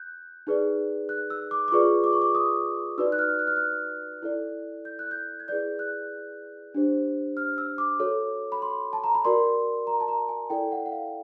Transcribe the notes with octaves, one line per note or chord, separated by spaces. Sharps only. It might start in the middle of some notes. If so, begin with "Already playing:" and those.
Already playing: F#6 G6
D#4 G#4 B4 D5
F#6
E6
D6
D6
F4 G#4 B4 D5 C#6
D6
C#6
D6
D#6
D#4 F#4 B4 D5 E6
F#6
F6
F#6
F6
F#6
E4 A4 D5
G6
F#6
G6
G#6
E4 G#4 B4 D5 G6
F#6
D4 G4 C5
F6
E6
D6
F#4 A4 C#5
B5
C6
A5
A#5
B5
F#4 A#4 D5 C6
A#5
A5
A#5
G#5
E4 A4 D5 G5
F#5
F#5
F5